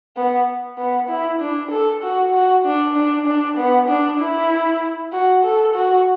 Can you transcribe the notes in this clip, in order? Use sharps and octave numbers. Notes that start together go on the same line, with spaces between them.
B3
B3
E4
D4
A4
F#4
F#4
D4
D4
D4
B3
D4
E4
F#4
A4
F#4